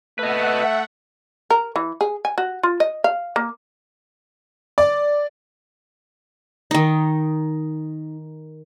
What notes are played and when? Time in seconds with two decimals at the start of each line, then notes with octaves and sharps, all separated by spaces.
0.19 A3 B4 D#5 E5 F#5
1.50 A#4
1.76 E3
2.01 G#4
2.25 G#5
2.38 F#4
2.63 F4
2.80 D#5
3.04 F5
3.36 A#3
4.78 D5
6.71 D#3 D#4